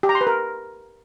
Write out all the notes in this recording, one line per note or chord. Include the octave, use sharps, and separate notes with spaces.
G4
A#5
C6
B4
A#4